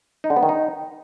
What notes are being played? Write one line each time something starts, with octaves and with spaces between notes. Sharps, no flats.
D#4
D3
B3
D#3
D#4